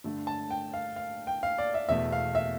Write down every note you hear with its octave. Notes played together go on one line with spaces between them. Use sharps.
G2 D3 A3
A5
G5
F5
F5
G5
F5
D5
E5
E2 B2 A3 E5
F5
E5